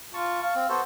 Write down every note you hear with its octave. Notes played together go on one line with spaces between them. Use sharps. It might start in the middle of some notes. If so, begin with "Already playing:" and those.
F4 A5 C#6
F5
C4
B3 F#4 A4 C5